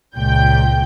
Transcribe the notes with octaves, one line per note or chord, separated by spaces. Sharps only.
C#2 A#2 G5 G6